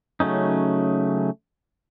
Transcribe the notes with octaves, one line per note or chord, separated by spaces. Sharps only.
C#3 F#3 A3 C#4 D#4